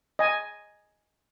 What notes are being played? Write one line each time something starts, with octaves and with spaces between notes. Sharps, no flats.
D#5 G#5